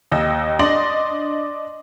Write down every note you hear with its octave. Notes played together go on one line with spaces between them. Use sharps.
D#2 D#5 E6
D4 D5 D#5 C6 A#6 F#7